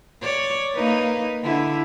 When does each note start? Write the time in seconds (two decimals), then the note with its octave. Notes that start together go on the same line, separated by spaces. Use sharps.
0.21 C#5 D5
0.73 A#3 D#4 B4
1.43 D3 E4